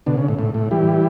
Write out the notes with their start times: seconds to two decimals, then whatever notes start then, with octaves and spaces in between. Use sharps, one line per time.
0.06 B2 D3
0.17 C#3
0.28 A2
0.39 A2
0.54 A2
0.71 E3 G3